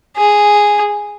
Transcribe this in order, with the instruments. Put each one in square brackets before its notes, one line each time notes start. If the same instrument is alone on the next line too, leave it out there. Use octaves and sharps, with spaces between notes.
[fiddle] G#4